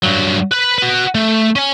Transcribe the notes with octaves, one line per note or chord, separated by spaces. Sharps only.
G2 F#3
B4 B5
F#4 B4
A3
C#4 G#5